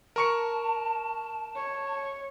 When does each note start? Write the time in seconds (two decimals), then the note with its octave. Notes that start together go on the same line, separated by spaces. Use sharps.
0.16 A#4 A5 C#6 C#7
1.56 C#5